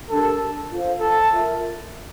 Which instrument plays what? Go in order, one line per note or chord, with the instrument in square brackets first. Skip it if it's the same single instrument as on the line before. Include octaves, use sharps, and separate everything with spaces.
[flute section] D4 G4 A#4 [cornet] A4
[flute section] F4 A4 C5 F5
[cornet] A4
[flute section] F4 A#4 E5